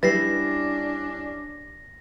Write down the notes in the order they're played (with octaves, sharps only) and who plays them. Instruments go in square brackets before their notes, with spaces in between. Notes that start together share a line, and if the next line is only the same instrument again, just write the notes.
[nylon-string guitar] G3 E4 [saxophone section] C#4 D4 [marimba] B4 [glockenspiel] A6 A#6 C7